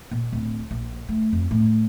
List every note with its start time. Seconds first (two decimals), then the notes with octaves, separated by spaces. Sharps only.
0.11 A#2
0.32 D1
0.71 A#1
1.09 A3
1.33 F2
1.51 A2